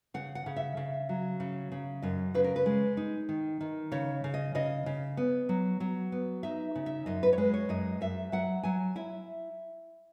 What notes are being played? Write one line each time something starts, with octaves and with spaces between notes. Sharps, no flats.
C#3 F#5
F#5
C#3
E5
C#3
F#3
C#3
C#3
F#2 D#5
C#3 B4
A#4
B4
G#3
D#4
D#3
D#3
C#3 C#5
C#3
D#5
C#3 D#5
C#3
B3
F#3
F#3
B3
D#4 E5
C#3
E5
F#2 D#5
B4
C#5
G#3 B4
C#5
F#2 D#5
F#2 E5
F#3 F#5
F#3 G#5
E4 E5